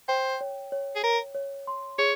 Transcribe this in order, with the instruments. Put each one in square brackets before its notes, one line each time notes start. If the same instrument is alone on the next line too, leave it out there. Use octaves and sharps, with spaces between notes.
[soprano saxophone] C5 [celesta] G5
[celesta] C#5
C#5
[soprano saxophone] G#4
[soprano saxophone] A#4 [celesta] C#5
[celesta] C#5
C6
[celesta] G#4 [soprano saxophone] C#5